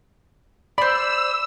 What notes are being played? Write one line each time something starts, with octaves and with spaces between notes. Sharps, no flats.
C5 D5 B5 E6